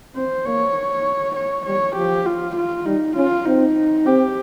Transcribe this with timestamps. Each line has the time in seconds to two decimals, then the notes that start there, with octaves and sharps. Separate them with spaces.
0.15 C4 C5
0.45 A#3 C#5
1.36 C#5
1.66 G3 C#5
1.96 F3 G4
2.26 F4
2.56 F4
2.85 G3 D#4
3.16 C#4 F4
3.46 C4 D#4
4.06 C4 G4